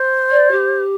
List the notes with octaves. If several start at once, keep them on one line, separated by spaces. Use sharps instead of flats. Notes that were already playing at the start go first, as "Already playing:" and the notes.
Already playing: C5
D5
G4